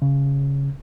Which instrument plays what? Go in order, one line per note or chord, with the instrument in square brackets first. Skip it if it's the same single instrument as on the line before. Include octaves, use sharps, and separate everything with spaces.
[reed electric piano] C#3